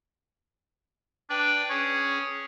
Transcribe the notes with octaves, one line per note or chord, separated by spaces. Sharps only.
D4 B4 D5 G5
C#4 G#4 C#5